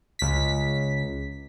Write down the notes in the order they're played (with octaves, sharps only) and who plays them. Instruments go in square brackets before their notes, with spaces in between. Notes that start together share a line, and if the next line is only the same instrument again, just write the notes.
[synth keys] C#2 B6